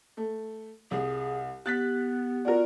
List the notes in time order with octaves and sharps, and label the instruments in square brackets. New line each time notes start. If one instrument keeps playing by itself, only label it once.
[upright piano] A3
[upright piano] C2 [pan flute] G#4
[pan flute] B3 [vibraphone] G4 [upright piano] F#6 A6 B6
[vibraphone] F4 D5 [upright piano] F#4 A#4